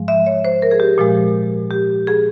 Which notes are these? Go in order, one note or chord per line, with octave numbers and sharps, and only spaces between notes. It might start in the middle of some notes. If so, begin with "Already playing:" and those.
Already playing: G#2 F3 G#3
E5
C#5
C5
A#4
G#4
G4
A#2 F3 G#3
G4
G#4